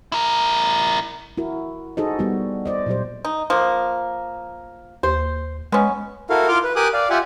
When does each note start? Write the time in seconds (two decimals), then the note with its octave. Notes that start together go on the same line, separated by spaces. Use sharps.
0.12 E4 A#4
1.37 E4 F#4 A#4
1.97 D#4 F#4 G#4 A4 C5 D#5
2.19 G3 B3 D#4 F#4 G4
2.66 C5 D5 D#5
2.86 A#2 F#3 G4 C5
3.25 D#4
3.50 F3 A#3
5.03 D#2 C5
5.72 G#3 B3 C#4
6.30 E4 F#4 A4 A#4 F5
6.48 F4 F5 C6 D6 F6
6.63 B4
6.76 G4 A#4 G#5 D6 D#6 F#6
6.94 D5 F5
7.10 F4 G4 E5 F#5 G#5